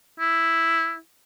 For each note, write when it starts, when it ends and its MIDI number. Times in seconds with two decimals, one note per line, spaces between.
0.20 0.97 64